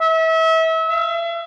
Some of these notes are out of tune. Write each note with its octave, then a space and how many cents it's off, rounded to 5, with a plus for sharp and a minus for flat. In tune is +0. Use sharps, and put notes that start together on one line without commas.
E5 -30
E5 +40